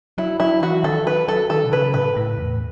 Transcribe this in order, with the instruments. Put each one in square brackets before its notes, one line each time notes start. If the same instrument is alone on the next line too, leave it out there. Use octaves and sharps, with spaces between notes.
[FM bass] F#3 [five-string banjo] E4
[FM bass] F#3 [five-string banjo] E4
[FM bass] E3 [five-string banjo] F#4
[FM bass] D#3 [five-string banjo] A4
[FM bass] F#3 [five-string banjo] B4
[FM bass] F#3 [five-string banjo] A4
[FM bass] D#3 [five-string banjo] A4
[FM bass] B2
[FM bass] C#3 [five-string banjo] B4
[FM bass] A2 [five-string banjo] B4
[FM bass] A2
E2